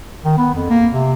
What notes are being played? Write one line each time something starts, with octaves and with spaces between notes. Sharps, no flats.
D#3
B3
F2
A#3
C3